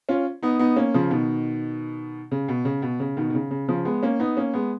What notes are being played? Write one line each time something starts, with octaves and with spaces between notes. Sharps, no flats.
C#4 F4
B3 D#4
B3 D#4
A#3 C#4
C#3 F3
B2 D#3
C#3
B2
C#3
B2
C#3
B2 D#3
D#3
C#3
C#3
C#3 F3
G#3 B3
A#3 C#4
B3 D#4
A#3 C#4
G#3 B3